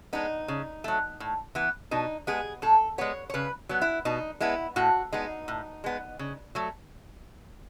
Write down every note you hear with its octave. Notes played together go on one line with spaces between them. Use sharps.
G#3 B3 D#4
C#3
F#3 A3
A2
E3 B3
B2 D#4
G#3 B3 G#4
A2 A4
G#3 B3 C#5
C#5
C#3 B4
F#3 B3
E4
B2 D#4
G#3 B3 E4
A2 F#4
G#3 B3 D#4
A2
G#3 B3
C#3
F#3 A3